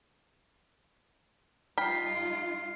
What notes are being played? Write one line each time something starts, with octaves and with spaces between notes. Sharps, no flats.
G3 D#4 F4 G5 B5 F6 C7